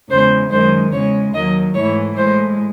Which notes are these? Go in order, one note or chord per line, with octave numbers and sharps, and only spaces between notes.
E2 C#3 G#3 C5
F#2 D#3 G#3 C5
E2 C#3 G#3 C#5
D#2 D#3 F#3 D#5
G#2 E3 A3 C#5
A2 G#3 C5